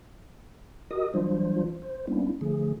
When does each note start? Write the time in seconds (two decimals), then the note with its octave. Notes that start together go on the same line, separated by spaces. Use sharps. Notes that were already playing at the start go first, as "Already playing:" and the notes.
0.91 F#4 G4 A#4 D#5 D#6
1.14 E3 F#3 G3 D4 F4 C5
1.82 C5
2.07 G3 A#3 B3 C#4 D4 E4
2.41 D3 F3 A3 G#4